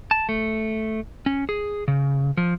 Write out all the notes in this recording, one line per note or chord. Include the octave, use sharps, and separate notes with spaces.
A5
A3
C#4
G#4
C#3
F3